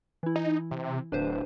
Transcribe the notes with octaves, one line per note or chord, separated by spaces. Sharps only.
E3 E4
D#4
C3
D1 D4 B4 C5